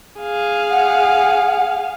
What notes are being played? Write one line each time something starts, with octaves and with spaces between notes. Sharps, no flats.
G#4 F5
F#5